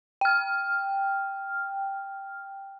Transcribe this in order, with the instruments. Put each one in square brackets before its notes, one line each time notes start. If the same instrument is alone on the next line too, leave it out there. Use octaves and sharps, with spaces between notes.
[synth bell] G5 F6